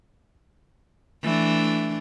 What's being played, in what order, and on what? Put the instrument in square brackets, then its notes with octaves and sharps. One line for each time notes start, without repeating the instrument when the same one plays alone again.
[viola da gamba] E3 A3 D4